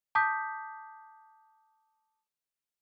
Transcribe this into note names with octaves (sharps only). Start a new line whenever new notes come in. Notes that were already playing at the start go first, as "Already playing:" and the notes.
A5 D6 D#6 G6 B6